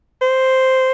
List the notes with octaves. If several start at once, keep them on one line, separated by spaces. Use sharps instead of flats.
C5